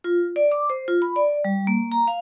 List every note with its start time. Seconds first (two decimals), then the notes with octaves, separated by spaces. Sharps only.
0.04 F4
0.36 D5
0.52 D6
0.70 C5
0.88 F4
1.02 B5
1.16 D5
1.44 G3
1.67 A#3
1.92 A#5
2.07 F5